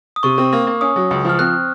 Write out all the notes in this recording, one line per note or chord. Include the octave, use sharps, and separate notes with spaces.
D#6
C3 C#6
C4
A#3
A#3
C#4 D#6
F#3
C#2
F3 F6
C4 F#6